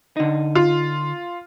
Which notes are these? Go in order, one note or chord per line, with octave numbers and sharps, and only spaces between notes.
D3 D#4
F4